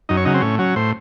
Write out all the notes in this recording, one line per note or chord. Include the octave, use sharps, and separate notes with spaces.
F#2 D#4
C#5
C#3 F#3 D#4
C4
A2 C#4
F#3 C#4
A2 C5